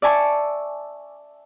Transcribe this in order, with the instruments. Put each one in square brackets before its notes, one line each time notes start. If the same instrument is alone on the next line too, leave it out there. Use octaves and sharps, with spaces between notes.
[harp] D5 E5 G#5 A5 C#6